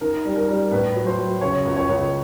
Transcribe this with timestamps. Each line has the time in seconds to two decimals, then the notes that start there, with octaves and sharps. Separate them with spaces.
0.01 D#3 A#4
0.25 G3
0.36 A#4
0.49 G3
0.71 A2 B4
0.95 F#3
1.07 C5
1.18 F#3
1.41 C#3 C#5
1.65 C#2
1.76 C#5
1.89 C#2